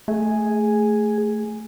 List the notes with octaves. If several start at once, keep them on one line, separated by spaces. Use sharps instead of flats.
A3 G#4